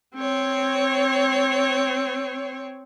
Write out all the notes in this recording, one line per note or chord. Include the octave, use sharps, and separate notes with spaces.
C4 C#5